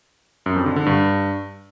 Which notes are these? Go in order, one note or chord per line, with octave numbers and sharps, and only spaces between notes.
F#2
F2
D3
D3
G2